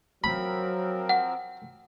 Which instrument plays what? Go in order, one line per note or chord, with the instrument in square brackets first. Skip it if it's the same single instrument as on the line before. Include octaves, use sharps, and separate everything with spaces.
[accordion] F3 C4 A#4 [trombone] F#3 [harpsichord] B5
[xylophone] F#5